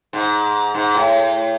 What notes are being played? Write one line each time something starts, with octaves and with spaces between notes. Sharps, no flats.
G#2
G#2
A2